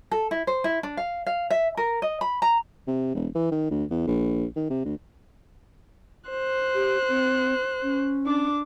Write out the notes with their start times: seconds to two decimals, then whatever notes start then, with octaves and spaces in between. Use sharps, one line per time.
0.11 A4
0.31 E4
0.47 C5
0.64 E4
0.83 D4
0.97 F5
1.26 F5
1.50 E5
1.77 A#4
2.02 D#5
2.21 B5
2.42 A#5
2.87 C3
3.15 E1
3.35 E3
3.51 D#3
3.71 D2
3.90 E2
4.07 A#1
4.56 D#3
4.70 C3
4.85 D2
6.30 C5 F#6
6.74 G4
7.09 C4
7.83 C#4
8.26 D4 D6